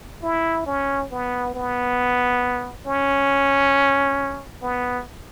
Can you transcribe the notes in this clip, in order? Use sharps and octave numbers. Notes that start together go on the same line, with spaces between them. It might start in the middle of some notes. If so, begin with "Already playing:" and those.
E4
C#4
B3
B3
C#4
B3